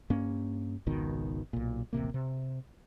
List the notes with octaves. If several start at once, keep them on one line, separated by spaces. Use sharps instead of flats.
G2 A#3 C#4
G#1 C#2 B2 D#3
B1 A#2
D#1 A1 C3 A#3
C3